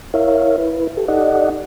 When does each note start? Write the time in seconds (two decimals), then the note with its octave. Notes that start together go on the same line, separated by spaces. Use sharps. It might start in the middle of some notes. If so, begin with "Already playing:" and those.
0.14 E4 A#4 C#5 E5 F5
0.58 E4 B4
0.97 G4 A4
1.08 D#4 G4 A4 D5 D#5 F#5